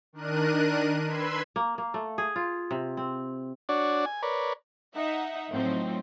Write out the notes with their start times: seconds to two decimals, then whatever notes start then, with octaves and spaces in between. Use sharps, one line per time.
0.13 D#3 D4 A#4 F#6 D#7
1.05 B4 B5 C6 E6 G#6
1.56 A#3
1.78 A#3
1.94 A3
2.18 G#4
2.36 F4
2.71 C3
2.97 C4
3.69 D4 F#4 C#5 D5
4.06 G#5
4.23 A#4 B4 C#5 D5
4.95 D#4 E5 F#5
5.51 A2 F3 F#3 C4 D#4